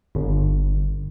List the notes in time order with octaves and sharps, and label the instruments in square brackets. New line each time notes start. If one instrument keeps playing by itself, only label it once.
[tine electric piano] G1